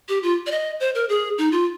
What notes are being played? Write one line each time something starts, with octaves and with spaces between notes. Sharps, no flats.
G4
F4
D5
D#5
C5
A#4
G#4
D#4
F4